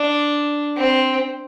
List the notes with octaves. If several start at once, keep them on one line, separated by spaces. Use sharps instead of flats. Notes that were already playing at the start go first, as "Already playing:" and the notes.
Already playing: D4
C4